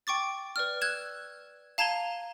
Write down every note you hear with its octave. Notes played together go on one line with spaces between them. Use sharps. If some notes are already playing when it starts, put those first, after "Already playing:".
G5 C#6 D6 A6
B4 D5 F6
E6 F#6 G#6 E7
F5 A5 A#5 G#6 D#7 G7